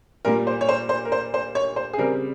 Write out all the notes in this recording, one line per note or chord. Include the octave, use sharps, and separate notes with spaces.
A#2 G3 A#3 A#4
C5
C#5
C5
C5
A#4
C5
C5
C#5
C5
G#4
C#3 G3 C4 A#4